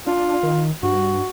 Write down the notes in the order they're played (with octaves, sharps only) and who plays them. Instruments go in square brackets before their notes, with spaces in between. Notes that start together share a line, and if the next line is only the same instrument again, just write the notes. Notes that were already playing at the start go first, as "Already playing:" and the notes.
[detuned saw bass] D4 [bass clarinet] F4
[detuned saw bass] D#3
[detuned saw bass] G2 [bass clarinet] F#4